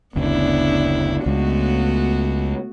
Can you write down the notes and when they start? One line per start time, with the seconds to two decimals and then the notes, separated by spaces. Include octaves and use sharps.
0.15 F#1 D2 C#3 B3 D4 E4
1.26 C#2 G#3 A3 B3 F#4